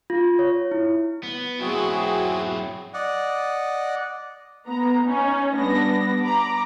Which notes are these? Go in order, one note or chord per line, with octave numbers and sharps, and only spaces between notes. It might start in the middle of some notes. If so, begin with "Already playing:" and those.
F4
C#5
E4
B3
F#3 C4 E4 F#4 G#4
D5 D#5 F#5
B3 A#5
C#4 D#4
G3 B3 D4 A#6
A#5 B5 D6